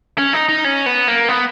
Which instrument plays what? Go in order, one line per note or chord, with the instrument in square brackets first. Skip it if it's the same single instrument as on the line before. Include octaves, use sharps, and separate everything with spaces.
[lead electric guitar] C#4
D#4
D#4
C#4
B3
A#3
B3